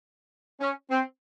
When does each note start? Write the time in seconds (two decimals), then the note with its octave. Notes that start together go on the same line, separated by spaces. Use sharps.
0.60 C#4
0.91 C4